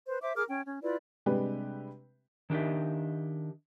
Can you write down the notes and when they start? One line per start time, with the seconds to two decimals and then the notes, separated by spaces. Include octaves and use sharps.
0.08 B4 C5
0.22 C5 E5 D6
0.36 G#4 A#4 D6 F6
0.48 C#4 G5
0.65 C#4
0.82 E4 F4 B4 D5
1.26 C3 G3 G#3 D4 G4 B4
2.50 D#3 D4 G4 D#5 E5